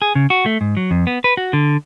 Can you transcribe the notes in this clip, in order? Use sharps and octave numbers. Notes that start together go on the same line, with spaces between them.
G#4
C#3
F#4
A3
G#2
F#3
F2
B3
B4
F#4
D3